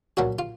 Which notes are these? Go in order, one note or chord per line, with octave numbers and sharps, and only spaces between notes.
B1 A#2 F#3 A#3 F#4
F4